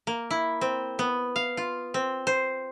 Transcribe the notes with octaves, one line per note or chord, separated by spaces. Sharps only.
A#3
E4
C4
B3
F5
F4
C4
C5